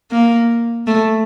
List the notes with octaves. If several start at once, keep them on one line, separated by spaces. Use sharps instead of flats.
A#3
A3